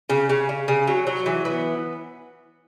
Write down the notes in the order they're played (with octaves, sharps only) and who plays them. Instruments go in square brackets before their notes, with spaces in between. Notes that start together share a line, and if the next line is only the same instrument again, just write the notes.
[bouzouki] C#3
C#3
C#3
C#3
F#3
F#3
E3
B3